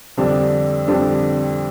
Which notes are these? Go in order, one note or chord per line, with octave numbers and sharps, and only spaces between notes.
F2 D3 G3 D4
F2 D3 G3 D4